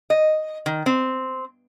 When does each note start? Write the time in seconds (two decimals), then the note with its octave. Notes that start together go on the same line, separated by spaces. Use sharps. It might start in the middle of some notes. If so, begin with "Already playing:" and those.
0.10 D#5
0.66 D#3
0.86 C4